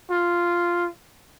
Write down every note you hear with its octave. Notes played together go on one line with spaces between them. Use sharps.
F4